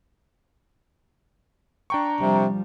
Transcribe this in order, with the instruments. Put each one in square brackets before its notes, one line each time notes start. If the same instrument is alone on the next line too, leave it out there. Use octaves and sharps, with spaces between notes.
[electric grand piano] D4 G5 C#6 [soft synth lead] A#5
[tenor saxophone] C3 [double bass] F3 G3